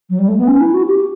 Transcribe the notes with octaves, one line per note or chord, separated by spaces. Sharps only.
F#3
G3
A3
B3
C#4
E4
F#4
G4